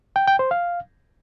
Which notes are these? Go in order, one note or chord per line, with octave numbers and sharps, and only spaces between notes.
G5
G5
C5
F5